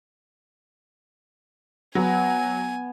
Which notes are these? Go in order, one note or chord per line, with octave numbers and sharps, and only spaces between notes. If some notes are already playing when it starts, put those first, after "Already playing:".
F#3 B3 G#5